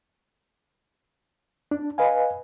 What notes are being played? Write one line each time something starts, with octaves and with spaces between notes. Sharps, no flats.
D4
B4 D#5 F5 G#5